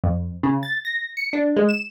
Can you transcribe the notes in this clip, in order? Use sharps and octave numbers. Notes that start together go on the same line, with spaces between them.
F2
C#3
A6
A#6
C#7
D4
G#3
E7